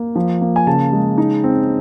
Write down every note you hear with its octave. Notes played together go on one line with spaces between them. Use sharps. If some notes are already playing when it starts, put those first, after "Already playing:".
Already playing: A#3
F3
A#3
G#5
C#3 A5
G#3
D#4
C4